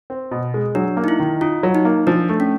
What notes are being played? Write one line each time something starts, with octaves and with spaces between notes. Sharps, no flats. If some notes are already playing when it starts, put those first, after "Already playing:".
C4
B2
G#3
F#3 D4
A#3
D#4
E4
D#3
D#4 F4
F#3
D#4
A#3
F3 D4
A3
C#4